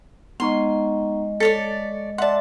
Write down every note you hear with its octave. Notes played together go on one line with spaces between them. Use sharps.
G#3 B3 D#4 D#5 C6 C#6
A4 C#5 D5 B6
D5 E5 F#5 A5 C6